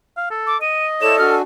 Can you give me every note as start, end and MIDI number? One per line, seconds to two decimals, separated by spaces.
0.17 0.29 77
0.31 0.56 69
0.47 0.60 86
0.62 1.40 75
0.62 0.86 99
1.02 1.17 64
1.02 1.36 69
1.02 1.17 73
1.02 1.17 74
1.02 1.18 100
1.19 1.42 62
1.19 1.42 66
1.19 1.42 80
1.19 1.35 89